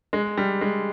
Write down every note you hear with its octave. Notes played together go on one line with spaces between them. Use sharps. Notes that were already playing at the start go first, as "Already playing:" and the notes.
G#3
G3
G#3